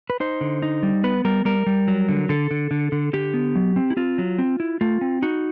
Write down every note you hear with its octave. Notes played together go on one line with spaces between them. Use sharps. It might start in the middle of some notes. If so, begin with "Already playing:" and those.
B4
D#4 C5
D3
D#4
G3
B3 B4
G3 A#4
G3 A#4
G3
F#3
D3
D3 A4
D3
D3
D3
D3 G4
B3
F#3
C4
E4
C4 F4
F#3
C4
E4
A3 F4
C4
D#4 F#4